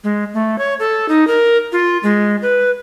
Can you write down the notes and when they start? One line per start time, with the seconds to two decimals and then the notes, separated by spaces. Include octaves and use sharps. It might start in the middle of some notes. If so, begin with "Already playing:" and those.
0.04 G#3
0.34 A3
0.59 C#5
0.80 A4
1.09 D#4
1.27 A#4
1.72 F4
2.03 G#3
2.42 B4